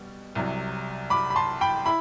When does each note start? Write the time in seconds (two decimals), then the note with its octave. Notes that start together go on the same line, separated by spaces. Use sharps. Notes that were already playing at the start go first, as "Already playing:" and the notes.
Already playing: B2 G3
0.35 C2 C3 F#3
1.10 B5 D6
1.30 B5
1.36 A5 C6
1.61 G5 B5
1.86 E4 B5